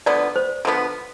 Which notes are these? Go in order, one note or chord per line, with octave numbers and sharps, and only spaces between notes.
D3 F3 B3 D5
C5
D3 F3 B3